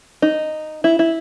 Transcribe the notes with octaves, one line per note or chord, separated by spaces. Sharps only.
D#4
E4
E4